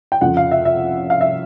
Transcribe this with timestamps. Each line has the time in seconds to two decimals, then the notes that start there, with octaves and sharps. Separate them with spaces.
0.12 G5
0.21 F2 C#3 F3 F#5
0.37 F5
0.51 E5
0.65 E5
1.10 F5
1.21 E5